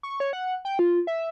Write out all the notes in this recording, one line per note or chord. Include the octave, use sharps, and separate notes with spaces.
C#6
C#5
F#5
G5
F4
E5